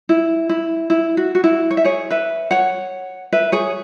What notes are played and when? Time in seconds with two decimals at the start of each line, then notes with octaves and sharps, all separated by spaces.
0.09 E4
0.49 E4
0.90 E4
1.17 F#4
1.35 F#4
1.44 E4
1.71 C#5
1.77 E5
1.84 G#4 C#5
2.10 B4 E5
2.51 C#5 F#5
3.33 B4 E5
3.52 G#4 C#5